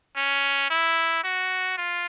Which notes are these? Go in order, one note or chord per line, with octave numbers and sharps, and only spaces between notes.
C#4
E4
F#4
F4